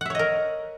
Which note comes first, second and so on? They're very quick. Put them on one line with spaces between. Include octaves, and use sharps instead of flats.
F#5 E5 C#5 D#5 A#4